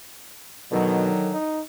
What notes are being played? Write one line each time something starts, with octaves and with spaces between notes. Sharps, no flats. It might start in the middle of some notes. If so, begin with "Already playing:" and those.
B2 D3 D#3 F#3
D#4